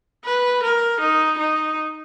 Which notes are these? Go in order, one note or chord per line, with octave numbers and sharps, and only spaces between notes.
B4
A#4
D#4
D#4